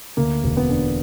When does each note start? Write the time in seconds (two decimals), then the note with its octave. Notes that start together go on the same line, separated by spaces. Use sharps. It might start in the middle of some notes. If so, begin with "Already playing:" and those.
0.17 D2 A#3
0.44 E1
0.57 B3
0.70 D3